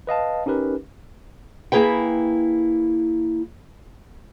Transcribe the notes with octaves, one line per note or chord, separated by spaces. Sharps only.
B4 D#5 F5 A5
C#4 D#4 G4 A#4 B4
A#3 E4 G#4 B4 G5